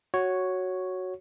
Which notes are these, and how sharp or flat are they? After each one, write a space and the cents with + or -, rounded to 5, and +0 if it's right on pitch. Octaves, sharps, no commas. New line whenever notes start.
F#4 +0 C#5 +0